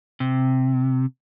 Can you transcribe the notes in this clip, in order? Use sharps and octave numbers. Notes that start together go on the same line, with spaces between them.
C3